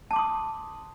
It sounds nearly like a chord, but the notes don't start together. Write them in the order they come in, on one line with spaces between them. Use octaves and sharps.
A5 D6 C6 D#6